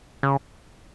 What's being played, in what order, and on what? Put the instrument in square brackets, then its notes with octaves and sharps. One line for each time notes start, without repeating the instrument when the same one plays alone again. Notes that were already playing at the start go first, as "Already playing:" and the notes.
[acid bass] C#3